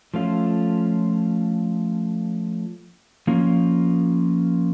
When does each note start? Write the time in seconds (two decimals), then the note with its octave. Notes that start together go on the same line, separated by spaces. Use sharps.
0.14 F3 A3 C#4 F4
3.27 F3 A#3 C#4 F4